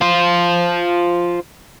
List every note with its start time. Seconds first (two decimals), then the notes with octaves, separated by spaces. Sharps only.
0.01 F4 C5